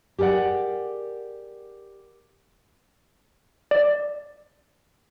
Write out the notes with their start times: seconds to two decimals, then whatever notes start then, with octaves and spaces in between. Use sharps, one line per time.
0.18 G4 G#4 A#4 D5 F#5
3.71 D5